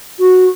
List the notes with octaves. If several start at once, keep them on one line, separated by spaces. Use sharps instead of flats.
F#4